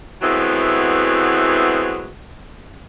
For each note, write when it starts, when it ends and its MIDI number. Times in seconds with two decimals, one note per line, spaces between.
0.22 2.08 52
0.22 2.08 54
0.22 2.08 56
0.22 2.08 57
0.22 2.08 59
0.22 2.08 60